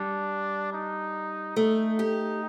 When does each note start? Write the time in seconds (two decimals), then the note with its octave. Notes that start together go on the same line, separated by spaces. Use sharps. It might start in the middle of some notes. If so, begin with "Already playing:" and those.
Already playing: G3 D4
0.73 D#4
1.56 A3 D#4
1.99 G4